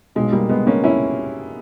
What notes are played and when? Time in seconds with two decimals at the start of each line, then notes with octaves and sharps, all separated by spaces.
0.15 B1 B2 G#3
0.32 G3 A#3
0.49 G#3 B3
0.67 A#3 C#4
0.84 C#4 E4